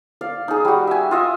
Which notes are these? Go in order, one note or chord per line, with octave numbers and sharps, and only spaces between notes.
D5 F5
D#4 G#4
G3 F#4
E5 G#5
F4 D#5 E5